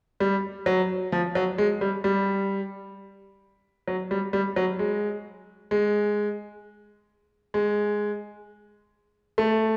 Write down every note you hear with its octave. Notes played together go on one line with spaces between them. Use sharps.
G3
F#3
F3
F#3
G#3
G3
G3
F#3
G3
G3
F#3
G#3
G#3
G#3
A3